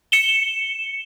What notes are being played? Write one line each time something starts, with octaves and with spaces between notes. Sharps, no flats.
C#7 E7 G7